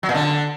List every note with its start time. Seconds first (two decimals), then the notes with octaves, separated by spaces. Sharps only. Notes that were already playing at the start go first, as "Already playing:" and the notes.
0.03 F#3
0.09 A#2
0.14 D3